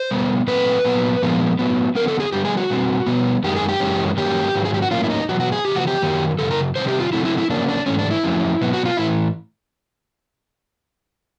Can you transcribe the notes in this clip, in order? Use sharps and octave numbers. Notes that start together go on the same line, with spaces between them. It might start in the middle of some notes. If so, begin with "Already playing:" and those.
Already playing: C5
B2 G3 B3
A#2 F#3 A3 C4 B4
A#2 F#3 B3
A#2 F3 G#3 B3
A2 F#3 B3
D3 F#3 B3 A#4
A4
G#4
D3 G3 B3 G4
G#4
F#4
B2 G3 C4
B2 G3 B3
F#2 D#3 G#3 G4
G#4
G4
F#2 C#3 E3 G#3 C#4
G2 D#3 F#3 A#3 C#4 G4
G#2 D#3 F#3
G#4
G4
F#4
A2 F#3 A#3 C#4 F4
E4
D#4
E2 B2 F#3 F#4
F#4
G#4
E2 C#3 F3 G4
F#4
G4
F#2 D#3 F#3
F#2 C#3 A4
A#4
C3 D#3 G3 C4 C5
G4
F4
C#3 F#3 A3 C4 E4
E4
E4
C#3 F#3 A#3 C#4 D4
D4
G#2 E3 A3 C#4
D4
E4
F2 C#3 F#3 A3 C#4
B2 F#3 B3
F#4
F4
A2 E3 E4